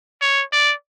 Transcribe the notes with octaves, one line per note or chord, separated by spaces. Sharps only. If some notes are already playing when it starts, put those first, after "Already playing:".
C#5
D5